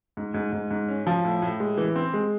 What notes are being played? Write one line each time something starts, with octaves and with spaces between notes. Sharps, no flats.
G#2
G#2
G#2
G#2
C#4
F3
A2
A2
G#3
E3
C4
G#3